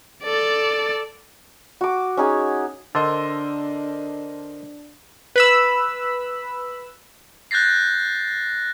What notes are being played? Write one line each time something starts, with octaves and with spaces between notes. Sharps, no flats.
A4 D5
F#4 D6
C#4 D#4 G#4 G#5
D3 D4 A#4 C5 D#5 C6 E6 A6
B4 B5 E6
F#6 G6 A6 A#6 C7